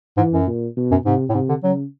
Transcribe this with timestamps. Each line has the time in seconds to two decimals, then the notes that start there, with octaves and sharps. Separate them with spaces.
0.17 G#2 E3
0.33 F#2
0.47 A#2
0.76 B2
0.91 F#2
1.06 G#2 C3
1.29 A2
1.34 G#2 C3
1.49 D3
1.63 C#3 F#3